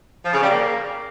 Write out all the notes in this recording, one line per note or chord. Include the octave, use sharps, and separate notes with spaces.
F3
C#3
G3
A#3